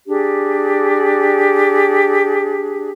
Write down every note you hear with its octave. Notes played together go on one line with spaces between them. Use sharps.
D4 G4 G#4